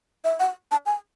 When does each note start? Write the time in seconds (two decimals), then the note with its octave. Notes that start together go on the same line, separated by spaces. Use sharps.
0.24 E5
0.40 F#5
0.71 A5
0.86 G#5